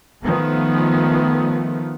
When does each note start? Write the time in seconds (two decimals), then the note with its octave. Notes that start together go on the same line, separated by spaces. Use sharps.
0.22 D#3 F3 A3 B3